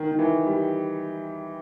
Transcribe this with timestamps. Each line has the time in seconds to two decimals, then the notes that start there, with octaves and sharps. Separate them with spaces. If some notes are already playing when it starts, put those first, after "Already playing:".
Already playing: D#3
0.11 D#3
0.19 E3
0.46 G3